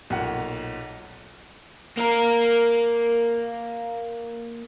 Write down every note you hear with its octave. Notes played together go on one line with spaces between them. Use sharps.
B1 A#2 F#5
A#3 A#4